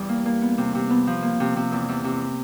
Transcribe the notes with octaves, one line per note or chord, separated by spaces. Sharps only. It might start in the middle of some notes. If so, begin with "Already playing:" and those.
Already playing: E2 G3
A#3
A#3
B3
C3
C3
B3
F3
A#3
C3
C3
E2
E2
C3